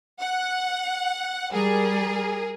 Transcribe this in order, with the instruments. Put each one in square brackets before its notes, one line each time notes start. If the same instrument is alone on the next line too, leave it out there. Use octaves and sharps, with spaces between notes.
[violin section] F#5
[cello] G3 [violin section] G#4 A#4